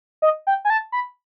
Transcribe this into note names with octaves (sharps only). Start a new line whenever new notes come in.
D#5
G5
G#5
A5
B5